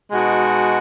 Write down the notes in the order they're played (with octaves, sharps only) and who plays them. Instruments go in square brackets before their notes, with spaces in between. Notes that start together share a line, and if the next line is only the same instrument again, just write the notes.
[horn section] B2 G#3 D#4 F#4